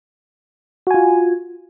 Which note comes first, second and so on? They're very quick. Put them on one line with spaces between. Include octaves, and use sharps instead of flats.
F#4 G#5 F4